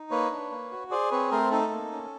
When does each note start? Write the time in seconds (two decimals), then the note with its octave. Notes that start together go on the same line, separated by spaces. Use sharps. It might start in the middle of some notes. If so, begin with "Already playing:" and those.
Already playing: D#4
0.11 A#3 B4 C#5
0.31 D4
0.51 A#3
0.71 F#4
0.91 G#4 C5 D5
1.11 C4 B4 C#5
1.31 A3 A#4 C5
1.51 D#4 A4
1.72 A#3
1.92 C#4